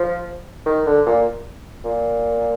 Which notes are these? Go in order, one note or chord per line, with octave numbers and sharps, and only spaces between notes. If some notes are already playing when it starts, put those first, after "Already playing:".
Already playing: F3
D#3
D3
A#2
A#2